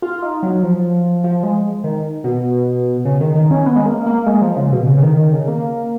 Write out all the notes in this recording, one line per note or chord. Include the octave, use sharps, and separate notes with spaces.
F4
D#4
F#3
F3
F3
G#3
D#3
B2
C#3
D#3
D#3
C#4
B3
G#3
A#3
A#3
G#3
F3
C#3
B2
C#3
C#3
D#3
D#3
C#3
A#3